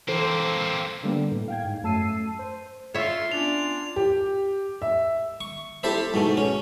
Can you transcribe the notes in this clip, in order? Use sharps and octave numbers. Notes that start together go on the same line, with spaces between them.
E3 A#3 C4 A4 C5
D3 G3 A#3 B3
A2
F5 G5 G#6
G#2
F#2 A3 A5 E6 C7 D#7
C5
F4 C#5 E5 C6
B3 C#4 D4 F4 F7
G4
E5
C#6
E4 G4 A4 C5 E5
G#2 B2 A3
C#4